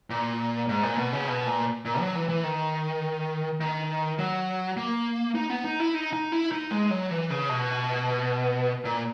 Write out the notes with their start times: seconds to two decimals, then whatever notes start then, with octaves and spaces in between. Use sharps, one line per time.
0.10 A#2
0.69 G#2
0.83 A#2
0.98 B2
1.13 C#3
1.28 B2
1.47 A#2
1.85 A#2
2.00 F#3
2.15 E3
2.29 E3
2.44 D#3
3.61 D#3
4.19 F#3
4.77 A#3
5.35 D#4
5.50 B3
5.64 D#4
5.80 E4
5.94 D#4
6.13 D#4
6.32 E4
6.52 D#4
6.71 G#3
6.90 F#3
7.11 E3
7.30 C#3
7.49 B2
8.85 A#2